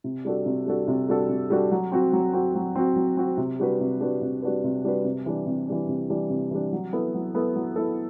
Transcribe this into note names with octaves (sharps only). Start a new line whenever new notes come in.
C3
G3 D4 F#4 A4
C3
G3 D4 F#4 A4
C3
G3 D4 F#4 A4
C3
G3 D4 F#4 A4
F#3
C4 F#4
F#3
C4 F#4
F#3
C4 F#4
F#3
C4 F#4
C3
G3 D4 F#4 B4
C3
G3 D4 F#4 B4
C3
G3 D4 F#4 B4
C3
G3 D4 F#4 B4
C3
E3 G3 D4
C3
E3 G3 D4
C3
E3 G3 D4
C3
E3 G3 D4
F#3
B3 E4 A4
F#3
B3 E4 A4
F#3
B3 E4 A4